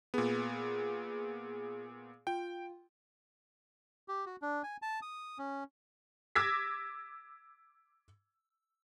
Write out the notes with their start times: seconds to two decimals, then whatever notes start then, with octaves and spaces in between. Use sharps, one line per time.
0.14 A#2 B3 G#4
2.27 F4 G5
4.08 G4
4.26 F#4
4.42 D4
4.63 G#5
4.82 A5
5.02 D#6
5.38 C#4
6.35 D6 E6 G#6 A#6 B6